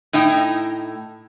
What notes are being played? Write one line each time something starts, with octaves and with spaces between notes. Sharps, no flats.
A2 D#4 E4 G5